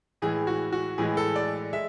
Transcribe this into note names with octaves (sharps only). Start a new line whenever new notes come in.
A2 E3 G#3 G#4
F#4
F#4
A2 E3 G#3 G#4
A4
D5
G#3 E5